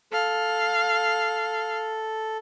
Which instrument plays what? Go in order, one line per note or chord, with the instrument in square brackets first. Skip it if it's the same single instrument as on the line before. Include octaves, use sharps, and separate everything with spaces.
[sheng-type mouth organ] A4 [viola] F5